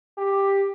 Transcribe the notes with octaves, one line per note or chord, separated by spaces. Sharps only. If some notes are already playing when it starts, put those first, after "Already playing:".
G4